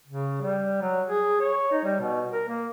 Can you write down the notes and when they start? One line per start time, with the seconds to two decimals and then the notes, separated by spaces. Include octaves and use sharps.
0.07 C#3
0.41 G3
0.81 F#3
1.08 G#4
1.40 C#5
1.71 D#4
1.84 G3
2.00 B2
2.31 A#4
2.48 A#3